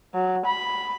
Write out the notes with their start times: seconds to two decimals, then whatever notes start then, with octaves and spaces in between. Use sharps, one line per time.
0.14 F#3
0.46 B5